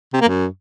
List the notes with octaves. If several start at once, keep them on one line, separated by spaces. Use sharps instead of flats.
C3
A#3
F#2